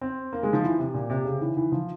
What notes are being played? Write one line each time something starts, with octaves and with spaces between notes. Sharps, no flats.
C4
A#3
G#3
F3
E3
C3
A#2
C3
C#3
E3
E3
F3